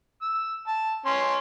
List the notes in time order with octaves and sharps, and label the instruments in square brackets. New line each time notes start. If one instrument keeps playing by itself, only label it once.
[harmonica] E6
A5
C#4 C6